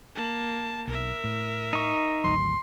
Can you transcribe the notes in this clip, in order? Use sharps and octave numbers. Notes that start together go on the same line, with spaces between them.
A#3 A5
B1 A#4 E5
A2
D#4 C#6
G#1 D2 F#3 C6